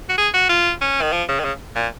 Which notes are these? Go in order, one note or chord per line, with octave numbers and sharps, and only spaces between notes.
F#4
G#4
F#4
F4
C#4
D#3
F3
C#3
D#3
C#3
A#2